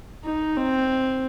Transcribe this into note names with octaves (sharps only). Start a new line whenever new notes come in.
D#4
C4